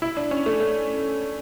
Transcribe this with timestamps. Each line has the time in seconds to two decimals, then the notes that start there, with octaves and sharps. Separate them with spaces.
0.02 E4
0.17 D4
0.31 C#4
0.46 A3
0.60 A3